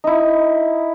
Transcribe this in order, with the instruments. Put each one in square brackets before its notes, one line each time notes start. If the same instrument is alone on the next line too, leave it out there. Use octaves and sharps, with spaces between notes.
[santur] D#4 E4